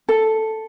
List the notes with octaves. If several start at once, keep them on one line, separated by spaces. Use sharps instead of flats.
A4